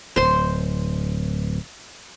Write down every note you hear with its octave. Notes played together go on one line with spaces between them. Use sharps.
D1 C5 C6